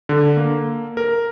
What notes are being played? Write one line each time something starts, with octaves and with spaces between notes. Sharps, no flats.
D3
A#3
A#4